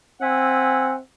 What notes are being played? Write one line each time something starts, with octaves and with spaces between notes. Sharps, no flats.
C4 E5 F#5 G#5